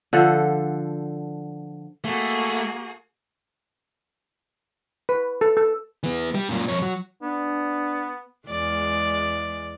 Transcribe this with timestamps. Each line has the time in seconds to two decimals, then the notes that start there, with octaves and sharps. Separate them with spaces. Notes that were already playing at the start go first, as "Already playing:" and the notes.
0.13 D3 F3 A4 F#5
2.05 A3 A#3 F#4 G#4
5.09 B4
5.41 A4
5.57 A4
6.03 E3 B3
6.35 G3
6.49 F#2 A#2
6.68 F2 C#5
6.82 F#3
7.22 B3 D4
8.48 E2 G#3 D5